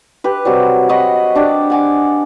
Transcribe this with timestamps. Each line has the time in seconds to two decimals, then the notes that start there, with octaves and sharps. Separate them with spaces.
0.24 G4 B4
0.45 C3 F#3 G3
0.89 F#4 D#5 B5
1.35 D4 G4 D5
1.70 F#5 G#5 D6